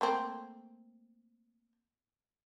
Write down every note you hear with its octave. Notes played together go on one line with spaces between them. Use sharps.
A3 A#3 C4